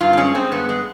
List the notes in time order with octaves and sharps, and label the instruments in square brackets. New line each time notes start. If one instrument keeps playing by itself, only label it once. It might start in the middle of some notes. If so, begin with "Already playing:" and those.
[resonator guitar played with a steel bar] G2 F4
C4
G#3 C#4
G#3 C4
G2 B3
G#3